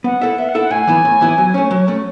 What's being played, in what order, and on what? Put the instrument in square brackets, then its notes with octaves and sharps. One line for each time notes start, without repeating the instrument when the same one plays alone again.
[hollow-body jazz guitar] B3 [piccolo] F#5
[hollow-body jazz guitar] E4 A4 E5
[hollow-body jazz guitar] B3 [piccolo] E5
[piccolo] F#5
[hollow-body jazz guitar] E4 A4 E5
[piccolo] F#5
[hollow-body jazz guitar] A2 [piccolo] G#5
[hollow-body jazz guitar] E3 B3 E4
A2
E3 B3 E4
F#3
A3 C#4
F#3
A3 C#4